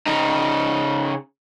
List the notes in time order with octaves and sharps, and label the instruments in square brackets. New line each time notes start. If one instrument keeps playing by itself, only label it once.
[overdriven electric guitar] C#3 D#4